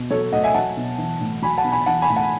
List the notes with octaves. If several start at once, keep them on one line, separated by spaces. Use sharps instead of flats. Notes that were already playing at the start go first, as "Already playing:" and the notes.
Already playing: B2
F#3 A4 C#5
A2 D#5 F#5
E5 G#5
F#3 F#5 A5
B2
E3
A2
F#3 G#5 B5
F#5 A5
B2
G#5 B5
E3 F#5 A5
G#5 B5
A2
F#5 A5